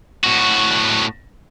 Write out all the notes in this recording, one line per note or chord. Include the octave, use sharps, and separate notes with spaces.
A2 F#4